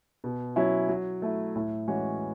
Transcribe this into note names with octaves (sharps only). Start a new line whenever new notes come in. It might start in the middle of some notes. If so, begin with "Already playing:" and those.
B2
F#3 C#4 E4
F#3
A3 E4
A2
E3 G#3 C#4 F#4